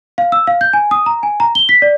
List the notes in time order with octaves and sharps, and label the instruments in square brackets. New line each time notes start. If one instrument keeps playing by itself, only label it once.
[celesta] F5
E6
F5
G6
G#5
D#6
A#5
G#5
A#5
G7
B6
D5